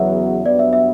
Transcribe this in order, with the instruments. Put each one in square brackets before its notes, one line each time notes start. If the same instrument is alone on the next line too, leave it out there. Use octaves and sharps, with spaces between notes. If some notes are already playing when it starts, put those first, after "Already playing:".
Already playing: [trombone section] E2 C#3 F#3 B3 F#4 [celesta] E5
[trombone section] G2 F#3 B3 [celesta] D5
[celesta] E5
E5